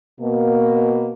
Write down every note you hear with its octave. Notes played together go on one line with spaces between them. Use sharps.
B2 A#3